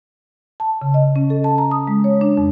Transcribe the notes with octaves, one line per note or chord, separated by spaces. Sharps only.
A5
C#3
D#5
C#4
A4
A5
A#5
D#6
G#3
C#5
D4
F2